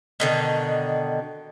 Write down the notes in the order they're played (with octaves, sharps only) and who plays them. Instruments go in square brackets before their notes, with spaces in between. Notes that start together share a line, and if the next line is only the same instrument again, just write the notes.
[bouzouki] B2 D3 D#3